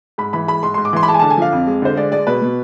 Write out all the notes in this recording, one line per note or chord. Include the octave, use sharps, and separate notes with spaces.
G#2 B5
E3 B5
G#3 B5
G#2 C6
G#2 C6
D6
E3 C6
B5
G#3 A5
G#5
D3 A5
G#5
F3 F5
F2
G#3
D3 C5
G#3 D5
G#3 D5
B2 B4
B2